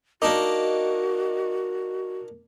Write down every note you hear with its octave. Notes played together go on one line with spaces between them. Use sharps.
A#3 D4 D#4 F#4 A#4 D#5 D6